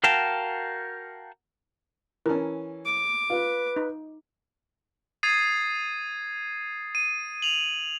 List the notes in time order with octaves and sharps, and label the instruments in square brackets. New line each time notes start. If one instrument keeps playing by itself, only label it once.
[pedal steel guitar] F#4 A#4 F5 G5 A5
[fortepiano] E3 C#4 [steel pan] A#4 A5
[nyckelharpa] D6
[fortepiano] F4 [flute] B4
[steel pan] D#4
[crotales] D#6 G#6 A6 C7 D#7
D#7
F7 F#7